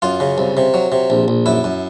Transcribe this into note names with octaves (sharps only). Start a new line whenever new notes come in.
F#2 F4
C#3
C2
C3
F#3
C3
A#1
A#1
F#2 E4
F#2